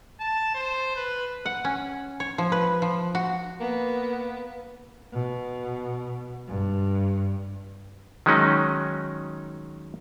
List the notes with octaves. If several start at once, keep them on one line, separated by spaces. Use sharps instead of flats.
A5
C5
B4
F#5
C#4
C#5
F3
B4
F3
F#4
A#3 B3
B2
G2
D#3 F#3 G#3 C#4 D#4